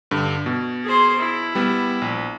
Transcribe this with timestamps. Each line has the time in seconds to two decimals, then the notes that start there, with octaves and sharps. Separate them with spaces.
0.11 G2 D3
0.46 B2
0.84 G#4 C5
1.18 E4
1.55 G3 B3
2.02 A#1